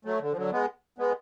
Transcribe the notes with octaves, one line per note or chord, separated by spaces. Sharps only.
F#3 A3
D3
F3
D3 F#3
G#3 B3
G#3 B3